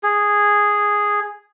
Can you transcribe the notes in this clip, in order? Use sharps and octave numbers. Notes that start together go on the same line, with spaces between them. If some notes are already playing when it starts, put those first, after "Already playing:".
G#4